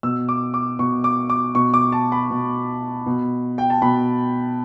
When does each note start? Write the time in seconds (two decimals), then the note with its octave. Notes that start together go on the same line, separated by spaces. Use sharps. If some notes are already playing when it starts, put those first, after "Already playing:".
0.03 B2 E6
0.29 D6
0.54 D6
0.79 B2 C#6
1.04 D6
1.30 D6
1.55 B2 C#6
1.74 D6
1.92 A5
2.12 B5
2.31 B2
3.06 B2
3.58 G5
3.70 A5
3.82 B2 B5